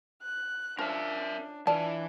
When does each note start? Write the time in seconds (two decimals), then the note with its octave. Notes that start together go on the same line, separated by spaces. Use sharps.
0.22 F#6
0.79 F3 C#4 D4 A#4 E5 F5
1.67 E3 D4 F4 D5 A5